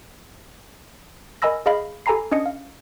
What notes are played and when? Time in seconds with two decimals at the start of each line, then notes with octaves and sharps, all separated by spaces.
1.42 A#4 D#5 G#5 B5 E6 A#6
1.66 G#4 D#5 F5 B5
2.06 G4 A4 G#5 A#5 B5 C7
2.31 C#4 D4 D#5 D#6 C#7
2.46 F5